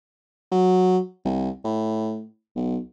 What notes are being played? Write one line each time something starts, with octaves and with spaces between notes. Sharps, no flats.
F#3
C2
A2
B1